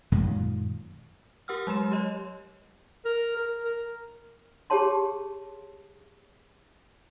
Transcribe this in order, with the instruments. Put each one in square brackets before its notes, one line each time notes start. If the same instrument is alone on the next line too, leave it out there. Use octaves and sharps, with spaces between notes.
[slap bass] F#2 A#2 D#3 G#3
[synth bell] G4 A#4 F#5 E6 F6
F#3 G#3 C6 E7
G4 C#5 D#5
[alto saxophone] A#4
A#4
A#4
[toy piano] G4 G#4 C#5 A5 C6